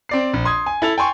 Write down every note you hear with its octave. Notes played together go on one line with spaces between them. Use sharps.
C4 D5 C7
A#1
C6 D#6 G#6
G#5
E4 A4 A6 F7
G5 G#5 C6 C#6